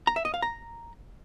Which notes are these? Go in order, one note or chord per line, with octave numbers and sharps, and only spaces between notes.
A#5
E5
D#5
F5
A#5